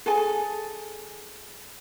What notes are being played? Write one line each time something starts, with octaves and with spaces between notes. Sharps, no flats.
G#4 A4 G#5